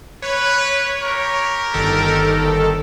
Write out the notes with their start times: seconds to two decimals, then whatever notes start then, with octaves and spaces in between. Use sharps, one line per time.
0.22 B4 C#5
1.01 G4 A#4
1.74 G1 D#3 A4